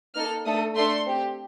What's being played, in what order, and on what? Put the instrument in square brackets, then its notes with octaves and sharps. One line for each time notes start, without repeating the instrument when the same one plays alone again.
[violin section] A#3 D#4 A4 F6
A3 D4 A4 D#6
A3 D4 A4 C6
C4 G4